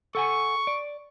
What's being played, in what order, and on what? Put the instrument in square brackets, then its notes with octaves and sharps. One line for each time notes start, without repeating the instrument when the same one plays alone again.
[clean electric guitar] A4 F#5 G#5 [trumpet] C#6
[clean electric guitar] D5